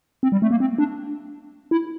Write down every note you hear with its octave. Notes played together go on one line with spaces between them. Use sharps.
C4
G3
A3
A#3
C4
D4
E4